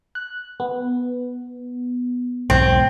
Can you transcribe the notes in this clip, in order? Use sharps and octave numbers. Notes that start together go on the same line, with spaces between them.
F#6
B3
B1 E2 G#2 C4